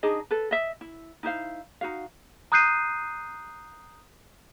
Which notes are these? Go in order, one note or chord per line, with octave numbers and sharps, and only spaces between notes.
D4 D#4 G#4 D#5
A4 B4
D#5 E5
E4
D#4 E4 C5 F5
D#4 F#4 F5
A#5 D#6 F#6 G6 C7 D#7